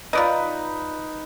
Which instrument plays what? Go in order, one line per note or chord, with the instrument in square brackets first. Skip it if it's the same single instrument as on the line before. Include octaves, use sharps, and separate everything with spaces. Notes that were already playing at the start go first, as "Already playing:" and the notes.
[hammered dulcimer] D#4 B4 [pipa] F4 D5 D#5